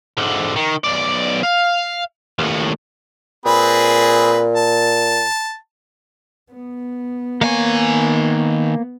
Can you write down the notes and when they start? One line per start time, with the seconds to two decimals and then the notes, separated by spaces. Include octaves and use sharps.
0.18 G#2 D3
0.56 D#3
0.84 B1 D5
1.43 F5
2.39 D#2 A2
3.46 A#2 C4 G#4 B4
4.56 A5
6.52 B3
7.41 D#3 A#3 C#5 G#5